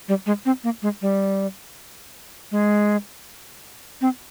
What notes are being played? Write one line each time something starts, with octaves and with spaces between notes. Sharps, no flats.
G3
G#3
C4
A#3
G#3
G3
G#3
C4